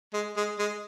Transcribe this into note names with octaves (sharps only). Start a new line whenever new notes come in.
G#3
G#3
G#3